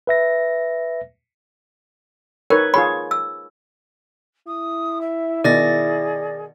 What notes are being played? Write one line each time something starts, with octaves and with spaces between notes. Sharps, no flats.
B4 E5 A#6
D#4 A#4 B4 C#5
F4 G#4 C#5 B5
E6
E4 D#6
E5
B2 D#3 G#4 D5 A6 A#6